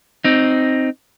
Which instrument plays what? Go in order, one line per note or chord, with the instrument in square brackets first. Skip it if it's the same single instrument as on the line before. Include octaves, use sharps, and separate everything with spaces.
[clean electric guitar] C4 D#4